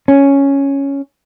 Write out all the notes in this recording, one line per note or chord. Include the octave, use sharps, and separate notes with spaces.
C#4